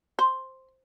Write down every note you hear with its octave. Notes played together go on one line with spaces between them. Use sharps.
C5